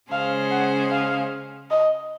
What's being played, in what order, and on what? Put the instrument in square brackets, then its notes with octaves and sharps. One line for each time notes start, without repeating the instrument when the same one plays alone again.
[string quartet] C#3 G#3 C#4 G#4 C5 [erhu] F5
[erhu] F#5
F5
D#5